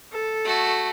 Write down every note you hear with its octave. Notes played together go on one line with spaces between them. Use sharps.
A4
A3 F#4